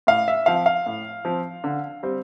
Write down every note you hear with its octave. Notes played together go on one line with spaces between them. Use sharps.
A2 F5
E5
F3 C4 F5
F5
A2
F3 C4
D3
G3 C4